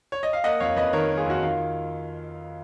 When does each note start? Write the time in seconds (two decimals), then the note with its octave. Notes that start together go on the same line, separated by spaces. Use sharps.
0.12 C#5
0.23 D#5
0.33 F5
0.44 A#3 D#5 F#5
0.60 F2 C#5 F5
0.76 F2 B4 D#5
0.93 D#3 A#4 C#5
1.10 A#3
1.17 F4 G#4
1.26 F2 F#4
1.42 D#3 F4